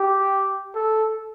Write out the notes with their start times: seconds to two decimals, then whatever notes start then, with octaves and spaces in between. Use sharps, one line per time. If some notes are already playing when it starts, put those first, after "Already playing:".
Already playing: G4
0.75 A4